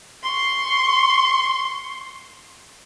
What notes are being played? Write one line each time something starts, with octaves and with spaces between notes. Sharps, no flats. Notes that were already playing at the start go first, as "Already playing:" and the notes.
C6 C#6